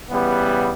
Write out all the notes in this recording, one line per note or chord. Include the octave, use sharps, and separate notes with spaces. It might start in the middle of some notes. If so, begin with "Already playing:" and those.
C#3 E3 G3 B3